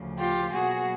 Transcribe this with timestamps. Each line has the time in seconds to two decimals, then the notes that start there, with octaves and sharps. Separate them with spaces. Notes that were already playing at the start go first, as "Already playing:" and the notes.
Already playing: D2 C#3 F3
0.18 F4 G4
0.52 B2 F#3 A#3 F#4 G#4